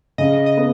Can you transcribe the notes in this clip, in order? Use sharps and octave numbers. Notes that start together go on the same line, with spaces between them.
C#3 D#5
D#5
B3